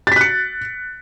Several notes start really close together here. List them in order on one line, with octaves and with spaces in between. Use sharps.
A6 B6 F#6 C#7